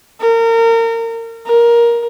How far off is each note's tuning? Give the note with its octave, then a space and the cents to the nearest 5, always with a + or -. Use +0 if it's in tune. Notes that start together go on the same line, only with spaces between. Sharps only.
A#4 -30
A#4 +15